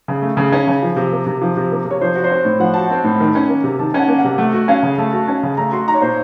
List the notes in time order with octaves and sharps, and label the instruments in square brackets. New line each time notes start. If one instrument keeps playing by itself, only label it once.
[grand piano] C#3
A3
C#3
C#4
C#3
F3
C3
A#3
C3
F3
C3
A#3
C3
[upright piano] C#5
[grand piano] F3 [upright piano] C5
[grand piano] F#4
[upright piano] C5
[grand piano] C4 [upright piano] C#5
[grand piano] A2
[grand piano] F3 [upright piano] F#5
[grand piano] F#4 [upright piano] A5
[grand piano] C4 [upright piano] F#5
[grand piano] A2
D#3
C#4
A#3
C3
[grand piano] D#3 [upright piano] A5
[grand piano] C#4 [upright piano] F#5
[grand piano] A#3
[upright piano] F#5
[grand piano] C3
[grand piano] A3 [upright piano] F#5
[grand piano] F#4
[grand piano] C#4 [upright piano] F5
[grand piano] C#3
[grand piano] A3 [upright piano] A5
[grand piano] F#4
C#4
C#3
[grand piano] A3 [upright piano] A#5
[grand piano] F#4 [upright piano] C6
[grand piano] D#4 [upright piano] A#5
[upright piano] C#5
[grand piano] A#2 [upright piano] C5